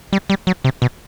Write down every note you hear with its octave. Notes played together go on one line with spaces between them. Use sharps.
G3
G3
F#3
C3
B2